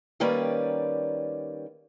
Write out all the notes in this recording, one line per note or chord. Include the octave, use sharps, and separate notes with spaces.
D#3 G3 A#3 C#4 B4 D5